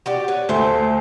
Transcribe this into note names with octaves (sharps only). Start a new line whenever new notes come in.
F#4 G4 D5
B4 C#5
D2 A3 C5 E5